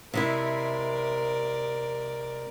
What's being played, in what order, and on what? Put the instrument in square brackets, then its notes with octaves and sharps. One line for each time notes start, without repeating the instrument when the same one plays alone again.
[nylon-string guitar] C3 G#3 E4 [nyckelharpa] A#4 D5